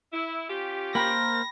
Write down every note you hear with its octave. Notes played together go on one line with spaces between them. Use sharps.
E4
C#4 F4 G4
A#3 A#4 C5 G5 B5 A#6